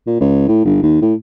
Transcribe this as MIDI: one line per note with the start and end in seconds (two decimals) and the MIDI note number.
0.07 0.20 46
0.20 0.45 37
0.48 0.62 45
0.65 0.79 31
0.83 1.00 39
1.02 1.14 45